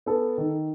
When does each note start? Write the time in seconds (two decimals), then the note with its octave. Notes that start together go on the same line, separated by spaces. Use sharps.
0.06 B3 A4
0.38 D#3